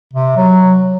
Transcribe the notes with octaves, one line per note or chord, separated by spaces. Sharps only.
C3
F#3